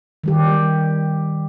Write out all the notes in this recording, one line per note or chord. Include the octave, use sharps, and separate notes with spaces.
D#3 G3 G4